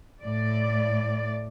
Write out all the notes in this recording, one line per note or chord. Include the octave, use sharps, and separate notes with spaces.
A2 D5